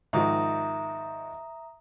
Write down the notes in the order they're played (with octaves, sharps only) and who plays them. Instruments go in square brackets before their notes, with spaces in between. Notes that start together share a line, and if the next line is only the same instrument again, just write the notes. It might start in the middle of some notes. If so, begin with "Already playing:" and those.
[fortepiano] G#2 D#3 F3 [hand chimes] E5 A#5 D#6